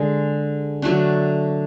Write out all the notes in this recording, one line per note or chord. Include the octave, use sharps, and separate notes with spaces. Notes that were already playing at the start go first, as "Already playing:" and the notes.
Already playing: D3 G#3
D3 F#3 A3 D4